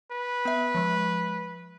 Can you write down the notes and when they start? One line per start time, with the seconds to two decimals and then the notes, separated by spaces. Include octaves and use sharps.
0.11 B4
0.45 B3 E5
0.75 F3 G#3